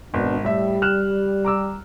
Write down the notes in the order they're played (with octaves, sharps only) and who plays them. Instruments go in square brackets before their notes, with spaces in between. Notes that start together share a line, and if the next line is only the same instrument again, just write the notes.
[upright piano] G#1 [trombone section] B2 D4
[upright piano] A2 E5 [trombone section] G3
[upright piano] F6 F#6 E7
A#5 D6 E6